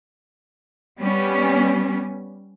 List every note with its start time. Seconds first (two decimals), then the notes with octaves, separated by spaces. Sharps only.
1.00 G3 B3 C#4